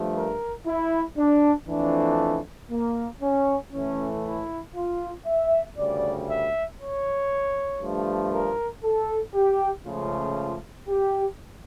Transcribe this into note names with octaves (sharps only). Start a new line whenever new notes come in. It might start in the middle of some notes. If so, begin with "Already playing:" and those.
Already playing: G2 F3 A3
A#4
E4
D4
F2 E3 A3 D4
A#3
C#4
A2 E3 A3 C#4
E4
F4
E5
D2 C#3 G3 D5
E5
C#5
G2 F3 A3
A#4
A4
G4
C#2 C#3 F3 A3 F4
G4